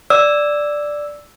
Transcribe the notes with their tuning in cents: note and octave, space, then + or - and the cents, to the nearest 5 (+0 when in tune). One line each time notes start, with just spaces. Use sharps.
D5 +0 E6 +0